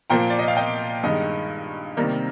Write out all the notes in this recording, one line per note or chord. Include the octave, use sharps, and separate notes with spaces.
A#2 F3 A#3 G5 A#5
D5
D#5
F5
D#5 G5
G2 D#3 G#3 D#5
C3 D#3 G3 A#3